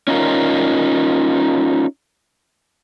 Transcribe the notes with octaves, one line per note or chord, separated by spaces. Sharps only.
C#4 D#4 F4 A#4